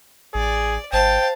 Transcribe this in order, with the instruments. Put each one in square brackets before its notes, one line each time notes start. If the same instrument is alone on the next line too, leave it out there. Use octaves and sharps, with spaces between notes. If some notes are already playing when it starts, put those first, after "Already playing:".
[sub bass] A1 [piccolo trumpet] G#4 [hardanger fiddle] D5
[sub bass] G#1 [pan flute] C5 [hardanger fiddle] F5 A5 [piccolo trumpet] G5